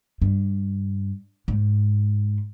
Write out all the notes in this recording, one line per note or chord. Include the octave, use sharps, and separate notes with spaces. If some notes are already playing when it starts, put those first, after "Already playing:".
G2
G#2